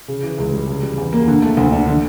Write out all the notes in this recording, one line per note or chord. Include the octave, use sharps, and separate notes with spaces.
C#3
E3
C#2
G3
C#3
G3
E2
A#3
D3
A3
D2
D4
D3